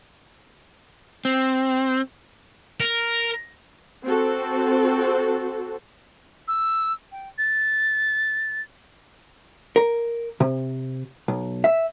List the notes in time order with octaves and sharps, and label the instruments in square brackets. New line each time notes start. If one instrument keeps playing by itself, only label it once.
[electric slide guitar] C4
[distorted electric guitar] A#4
[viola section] C4 F#4 A4
[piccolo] E6
G5
A6
[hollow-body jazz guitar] A#4
C3
B1
E5